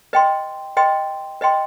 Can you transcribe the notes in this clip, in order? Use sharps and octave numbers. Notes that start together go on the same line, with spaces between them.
B4 D#5 G5 C6
B4 D#5 G5 C6
B4 D#5 G5 C6